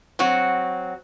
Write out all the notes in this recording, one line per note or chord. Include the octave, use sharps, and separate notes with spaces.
F#3 C4 F#4